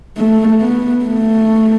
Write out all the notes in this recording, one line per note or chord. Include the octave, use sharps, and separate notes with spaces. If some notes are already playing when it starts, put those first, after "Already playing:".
A3
B3
A3